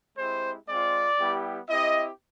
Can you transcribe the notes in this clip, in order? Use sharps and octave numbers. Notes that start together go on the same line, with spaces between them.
G#3 C4 E4 G4 C5
G#3 C4 F4 D5
G3 B3 E4 G4
C4 E4 G4 D#5